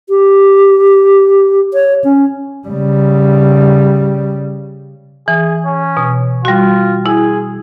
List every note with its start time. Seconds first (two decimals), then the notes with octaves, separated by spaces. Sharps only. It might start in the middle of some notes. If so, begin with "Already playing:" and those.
0.09 G4
1.74 C#5
2.04 C#4
2.68 C#3 G3
5.28 E3 G#4
5.65 C#4
5.97 B2
6.45 G3 F4 F#4
7.06 E4 G#4